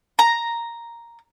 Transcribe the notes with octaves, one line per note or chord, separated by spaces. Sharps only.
A#5